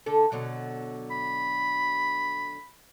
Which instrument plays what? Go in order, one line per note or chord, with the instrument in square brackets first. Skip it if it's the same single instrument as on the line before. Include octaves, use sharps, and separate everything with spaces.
[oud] D3 A4
B2 D3 F#3
[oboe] B5